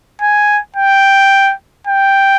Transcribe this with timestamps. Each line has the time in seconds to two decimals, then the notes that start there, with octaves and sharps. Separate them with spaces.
0.21 G#5
0.76 G5
1.87 G5